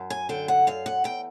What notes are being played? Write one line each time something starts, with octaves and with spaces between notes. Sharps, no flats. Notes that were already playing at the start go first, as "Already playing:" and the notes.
Already playing: F#2
G#5
D3 G5
F#5
F#2 F5
F#5
E2 G5